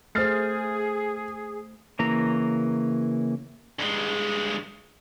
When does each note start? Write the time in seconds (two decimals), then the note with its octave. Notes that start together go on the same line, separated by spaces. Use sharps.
0.15 A3 G#4 C5 F6 A6 C7
1.99 C#3 E3 A#3 A#5
3.79 G2 G#3